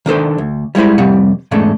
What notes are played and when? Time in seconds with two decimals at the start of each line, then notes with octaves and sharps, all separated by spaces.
0.06 D#3 D4 A4 C5
0.38 D2
0.75 G3 G#3 E4 C5 B5
0.98 F2 C3 G3 F#5
1.51 E2 G#2 C#3 A3 D4